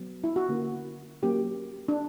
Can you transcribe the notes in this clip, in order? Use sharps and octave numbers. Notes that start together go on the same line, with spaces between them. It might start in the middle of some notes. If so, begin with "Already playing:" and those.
Already playing: F#3 B3
E4
F#4
D3 A#3 C#4
F#3 A#3 C#4 G4
D4